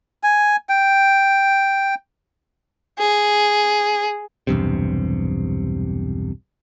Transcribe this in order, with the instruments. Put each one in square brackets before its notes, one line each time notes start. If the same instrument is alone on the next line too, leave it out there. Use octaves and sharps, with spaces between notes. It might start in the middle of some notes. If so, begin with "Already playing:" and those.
[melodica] G#5
G5
[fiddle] G#4
[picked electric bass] B1 E2 G2 C3